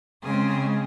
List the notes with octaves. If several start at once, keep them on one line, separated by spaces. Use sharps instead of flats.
C#3 G#3 C4 G#4